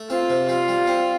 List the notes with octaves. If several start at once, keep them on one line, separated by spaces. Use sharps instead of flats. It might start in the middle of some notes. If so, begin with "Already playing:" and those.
Already playing: A3
C4 F4
C3
G3 F4
G3
C4